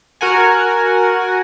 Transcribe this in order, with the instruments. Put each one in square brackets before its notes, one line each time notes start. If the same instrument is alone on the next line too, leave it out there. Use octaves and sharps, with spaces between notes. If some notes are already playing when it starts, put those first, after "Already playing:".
[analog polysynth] F#4 A#4 F#5 G#5